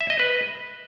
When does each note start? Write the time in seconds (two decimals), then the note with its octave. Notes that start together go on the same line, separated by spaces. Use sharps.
0.01 E5
0.10 D#5
0.19 B4